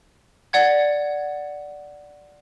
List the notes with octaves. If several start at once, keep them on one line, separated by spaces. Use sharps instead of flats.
D5 F#5 G#6